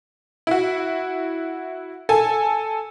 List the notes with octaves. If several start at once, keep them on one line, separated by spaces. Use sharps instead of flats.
E4 F#4
A4 G#5